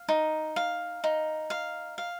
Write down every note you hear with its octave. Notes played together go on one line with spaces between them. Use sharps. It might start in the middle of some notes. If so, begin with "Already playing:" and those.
Already playing: F5
D#4
F5
D#4
F5
F5